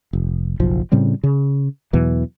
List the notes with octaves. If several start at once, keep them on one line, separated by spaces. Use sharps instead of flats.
F1
F#1 B1 F3
A2 C#3 G3 C4
C#3
E2 B2 E3 F#3